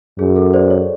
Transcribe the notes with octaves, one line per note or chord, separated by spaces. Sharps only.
F#2 G#4
A4
C5 D5
C#5